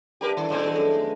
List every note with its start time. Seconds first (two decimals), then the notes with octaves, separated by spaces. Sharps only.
0.21 D3 E3 G3 G4 A#4 B4
0.37 G2 D#3
0.50 A#2 D#3 E3 G#3 B3
0.64 F#4 A4
0.76 F#2 A3 G#4 G5